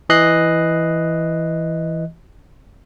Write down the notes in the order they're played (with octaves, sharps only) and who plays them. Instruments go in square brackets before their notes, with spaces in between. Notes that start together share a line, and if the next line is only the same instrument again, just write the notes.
[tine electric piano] E3 D#5 F#6 C7